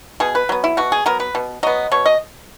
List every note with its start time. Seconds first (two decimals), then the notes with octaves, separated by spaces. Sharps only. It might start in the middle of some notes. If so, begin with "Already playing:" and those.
0.20 B2 G#4
0.35 B4
0.49 F#3 B3
0.64 E4
0.77 B2 F#4
0.92 G#4
1.06 F#3 B3 A#4
1.20 B4
1.35 B2
1.63 F#3 B3 D#5
1.92 B2 C#5
2.06 D#5